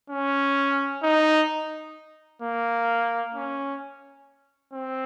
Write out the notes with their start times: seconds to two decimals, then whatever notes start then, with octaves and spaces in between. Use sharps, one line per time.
0.10 C#4
1.03 D#4
2.42 A#3
3.35 C#4
4.74 C4